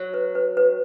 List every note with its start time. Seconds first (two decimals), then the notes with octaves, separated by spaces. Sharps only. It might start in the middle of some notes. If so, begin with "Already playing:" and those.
Already playing: F#3
0.14 B4
0.35 B4
0.57 B4